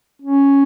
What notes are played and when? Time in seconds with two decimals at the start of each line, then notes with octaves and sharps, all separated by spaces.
0.22 C#4